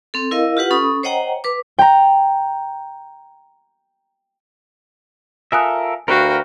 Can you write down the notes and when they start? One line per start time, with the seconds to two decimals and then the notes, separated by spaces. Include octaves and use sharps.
0.14 C4 A4
0.31 E4 A#4 D#5 F5
0.57 F4 G4 B4 F#5
0.71 C#4 A4 B5 D#6
1.03 C5 C#5 D#5 F#5 G5 A#5
1.44 B4 D6
1.79 G5 A#5
5.52 F4 A4 A#4 E5 G#5 D#6 F#6
6.08 D2 F#4 A#4 B4 F5 G5